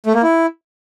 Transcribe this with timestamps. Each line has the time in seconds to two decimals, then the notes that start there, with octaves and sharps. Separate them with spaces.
0.06 A3
0.15 A#3
0.23 E4